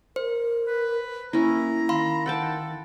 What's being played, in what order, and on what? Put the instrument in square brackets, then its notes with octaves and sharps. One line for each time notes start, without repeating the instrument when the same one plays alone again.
[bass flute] A#4 [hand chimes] C5
[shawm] B4
[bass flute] A#3 [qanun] C#4 E4 [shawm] A#5
[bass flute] D#3 [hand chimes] F5 B5 C6
[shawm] A4 [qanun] F#5 G5 A5